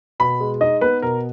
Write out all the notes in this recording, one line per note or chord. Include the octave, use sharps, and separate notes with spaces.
B2 B5
G#3
D#4 D#5
B3 B4
B2 A#4